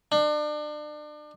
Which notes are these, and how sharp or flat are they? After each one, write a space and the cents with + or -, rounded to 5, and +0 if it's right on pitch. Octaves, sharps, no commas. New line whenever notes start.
D4 +35